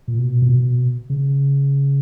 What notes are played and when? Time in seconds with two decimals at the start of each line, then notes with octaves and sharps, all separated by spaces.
0.08 A#2
0.19 B2
0.42 A#2
0.49 B2
1.10 C#3